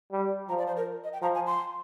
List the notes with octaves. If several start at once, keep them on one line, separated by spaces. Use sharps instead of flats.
G3
F3 A#5
D5
C5
A#4
D#5
G5
F3 A#5
G#5
C6